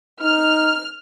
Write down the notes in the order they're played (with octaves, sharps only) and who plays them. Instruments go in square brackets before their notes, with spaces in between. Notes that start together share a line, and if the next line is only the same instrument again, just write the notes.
[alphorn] D#4 [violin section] F6